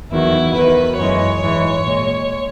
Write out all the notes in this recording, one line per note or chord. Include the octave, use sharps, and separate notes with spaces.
E2 D#3 F#3 E4
E2 D#3 F#3 B4
F#2 E3 G#3 C#5
G#2 E3 G#3
A#2 G#3